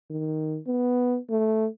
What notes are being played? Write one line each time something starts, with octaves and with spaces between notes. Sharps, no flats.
D#3
B3
A3